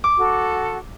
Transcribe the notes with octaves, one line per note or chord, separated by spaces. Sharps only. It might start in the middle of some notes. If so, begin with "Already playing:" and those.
D6
F#4 A4